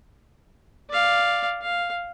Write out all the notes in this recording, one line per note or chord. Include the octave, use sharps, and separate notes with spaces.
D5 F5
F5